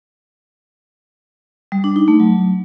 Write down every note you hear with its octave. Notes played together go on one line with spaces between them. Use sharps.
G3
D4
D#4
A3
F#3